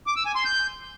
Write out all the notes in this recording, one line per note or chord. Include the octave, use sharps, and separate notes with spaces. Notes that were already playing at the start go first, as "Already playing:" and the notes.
D6
E6
G#5
C6
G6